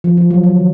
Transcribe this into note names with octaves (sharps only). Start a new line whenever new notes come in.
F3
F3
F#3
F#3
D#3